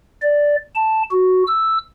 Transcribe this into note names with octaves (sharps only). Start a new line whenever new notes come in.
D5
A5
F#4
E6